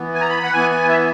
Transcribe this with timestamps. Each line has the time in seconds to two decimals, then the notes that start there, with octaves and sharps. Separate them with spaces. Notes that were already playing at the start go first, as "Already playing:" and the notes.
Already playing: E3 B3
0.14 G#5
0.21 A#5
0.29 B5
0.43 F#5
0.53 E3 B3 G#5
0.71 G#5
0.89 E5